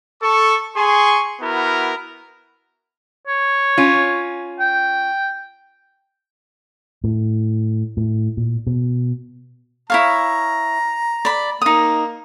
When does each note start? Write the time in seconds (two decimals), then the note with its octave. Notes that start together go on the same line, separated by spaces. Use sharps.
0.22 A4 C#6
0.76 G#4 G#5 C6 C#6
1.41 B3 E4 F#4 A#4
3.27 C#5
3.78 C#4 F4
4.60 G5
7.04 A2
7.97 A2
8.37 A#2
8.67 B2
9.90 E4 C#5 F5 A#5
11.25 D5 B5
11.62 A#3 D#4 D#6